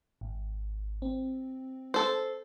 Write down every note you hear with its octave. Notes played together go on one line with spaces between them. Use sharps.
G#1
C4
A4 C5